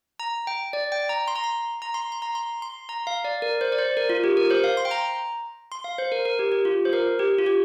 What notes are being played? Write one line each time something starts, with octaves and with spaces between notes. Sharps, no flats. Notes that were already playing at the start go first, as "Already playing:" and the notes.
A#5
G5
D5
G5
A#5
C6
A#5
C6
A#5
C6
C6
A#5
C6
C6
A#5
F5
D5
A#4
C5
D5
C5
A#4
F4
G4
A#4
C5
F5
C6
G5
A#5
C6
F5
C5
A#4
A#4
G4
G4
F4
C5
A#4
G4
F4
G4